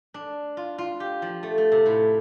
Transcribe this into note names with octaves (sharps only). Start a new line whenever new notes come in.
D4
F4
F4
G4
F3
A3
A3
C3
A2